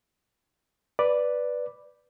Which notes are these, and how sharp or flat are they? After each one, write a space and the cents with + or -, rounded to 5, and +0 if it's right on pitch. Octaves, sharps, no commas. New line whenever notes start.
B4 +0 D5 +0